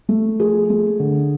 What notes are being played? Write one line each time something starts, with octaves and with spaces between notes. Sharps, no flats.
A3
F3 G#4
A3
D3